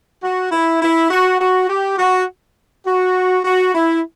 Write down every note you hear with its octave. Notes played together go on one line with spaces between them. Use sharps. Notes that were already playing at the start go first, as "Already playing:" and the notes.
F#4
E4
E4
F#4
F#4
G4
F#4
F#4
F#4
E4